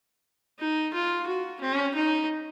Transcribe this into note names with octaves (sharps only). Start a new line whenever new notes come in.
D#4
F4
F#4
C#4
D#4